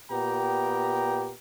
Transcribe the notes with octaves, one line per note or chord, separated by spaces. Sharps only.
A#2 B3 G4 G5 A#5